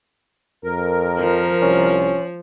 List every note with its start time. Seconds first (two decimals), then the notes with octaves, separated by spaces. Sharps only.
0.64 F2 A#4
1.19 F3
1.62 C2 C#4